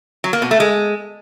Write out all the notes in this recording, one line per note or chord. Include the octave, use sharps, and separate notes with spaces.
F#3
A#3
B2
A3
G#3